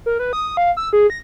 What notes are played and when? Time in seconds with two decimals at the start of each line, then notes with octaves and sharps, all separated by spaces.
0.06 A#4
0.19 B4
0.33 D#6
0.57 F5
0.77 E6
0.93 G#4
1.10 A#6